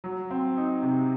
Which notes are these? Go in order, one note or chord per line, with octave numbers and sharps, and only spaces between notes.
F#3
C4
D#4
C3